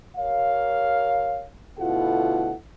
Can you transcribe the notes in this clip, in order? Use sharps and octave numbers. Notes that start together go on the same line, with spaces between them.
G4 A#4 C#5 F5
D2 B2 E4 F4 A4 F#5